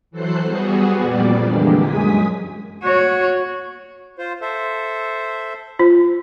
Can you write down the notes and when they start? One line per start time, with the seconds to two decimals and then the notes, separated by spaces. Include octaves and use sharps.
0.11 E3 F#3 A4 C5 F#6 C7
0.42 G3 B3 F#4 G#4
0.99 F2 A#2 G3 D5
1.41 D3 E3 G#3 A#3 D4 G4
1.77 F#2 G#3 G#5 D#6 B6
2.84 F#4 C#5
4.19 F4 C5
4.42 A4 C5 E5
5.79 F4 C5